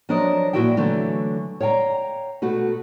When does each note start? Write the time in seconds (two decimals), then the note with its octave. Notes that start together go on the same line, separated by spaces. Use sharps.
0.09 F3 F#3 D4 A#4 C#5 D#5
0.53 A#2 F#3 E4 F#4 E5 G5
0.77 D3 E3 F#3 A3
1.61 C#5 F5 G5 G#5 A#5
2.42 B2 A3 F#4 B4